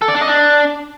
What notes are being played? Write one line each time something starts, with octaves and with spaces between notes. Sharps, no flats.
A4
D5
D4
D#5
D4